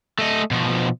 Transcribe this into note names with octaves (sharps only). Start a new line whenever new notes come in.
A3 D#5
B2 F3